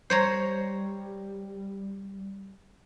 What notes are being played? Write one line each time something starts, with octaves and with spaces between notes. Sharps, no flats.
G3 C5 C#5 A#5